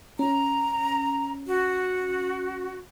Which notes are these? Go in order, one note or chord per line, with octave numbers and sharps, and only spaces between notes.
C#4 A#5
F#4